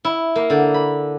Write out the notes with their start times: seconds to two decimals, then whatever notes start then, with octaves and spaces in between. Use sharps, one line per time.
0.05 E4
0.36 A#3
0.50 D3
0.74 B5